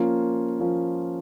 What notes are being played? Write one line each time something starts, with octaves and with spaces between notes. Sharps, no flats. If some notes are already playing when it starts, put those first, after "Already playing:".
Already playing: F3 A#3 C#4 F4
F3 A#3 C#4 F4